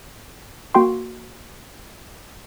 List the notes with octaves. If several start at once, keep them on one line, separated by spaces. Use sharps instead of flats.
A#3 F#4 G5 C6